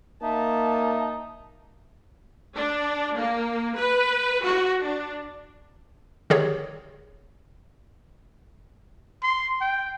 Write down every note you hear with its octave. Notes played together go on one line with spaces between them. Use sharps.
A#3 D#4 E5 A5
D4
A#3
B4
F#4
D4
D3 D#3 G4 G#4 C#5
C6
G5